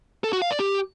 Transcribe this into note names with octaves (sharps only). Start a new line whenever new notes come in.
A4
F#4
F5
D5
G4